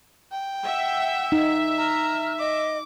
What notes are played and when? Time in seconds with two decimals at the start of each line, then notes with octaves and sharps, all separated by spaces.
0.32 G5
0.65 E5 F#5
1.32 D#4
1.78 A#5 F6
2.39 D#5 D6